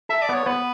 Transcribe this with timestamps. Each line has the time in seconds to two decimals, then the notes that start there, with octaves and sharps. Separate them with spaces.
0.09 A4 E5
0.22 D5
0.29 B3
0.34 C#5
0.46 B3 B4